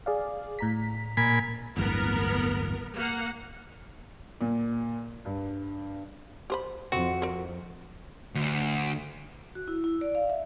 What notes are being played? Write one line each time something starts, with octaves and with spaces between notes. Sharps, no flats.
G#4 D5 F5
A2 A#5 B6
A#2 G#5 B5
D1 G1 E2 B3 A#4
A#3 F#5
A#2
G2
G4 C5 B5
F2 C4 F#4
A#4 C5
D2
F#4
E4
E4
D5
F5
E5